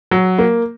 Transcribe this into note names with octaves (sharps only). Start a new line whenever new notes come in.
F#3
A#3